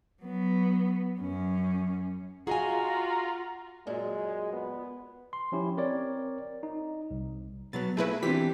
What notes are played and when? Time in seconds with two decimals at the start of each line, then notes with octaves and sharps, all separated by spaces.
0.22 F#3 B3
1.19 F#2 C#4
2.47 F4 F#4 G#4 D#5 G#5 A#5
3.87 F#2 A#2 G#3
4.53 B3
5.33 C6
5.52 F3 C#4 E4 G4
5.77 C4 A#4 C#5 D5
6.63 D#4
7.11 C2
7.73 B2 F#3 B3 A6
7.97 A3 A#3 E4 G#4 B4
8.23 E3 C4 D4 G4 B6